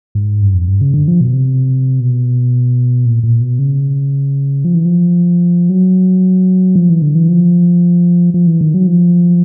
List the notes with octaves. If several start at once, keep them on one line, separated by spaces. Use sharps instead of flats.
G#2
G2
F2
G2
C#3
D3
F3
B2
C3
B2
A#2
A#2
B2
C#3
F3
E3
F3
F#3
F3
E3
D3
E3
F3
F3
E3
D#3
F#3
F3